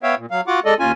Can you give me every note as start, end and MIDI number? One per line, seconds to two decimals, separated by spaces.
0.03 0.15 59
0.03 0.15 73
0.03 0.15 76
0.03 0.15 77
0.03 0.15 79
0.17 0.26 46
0.31 0.41 54
0.31 0.41 77
0.47 0.60 65
0.47 0.60 66
0.47 0.60 78
0.47 0.60 86
0.65 0.74 56
0.65 0.74 69
0.65 0.74 74
0.65 0.74 75
0.80 0.92 39
0.80 0.92 61
0.80 0.92 65
0.80 0.92 80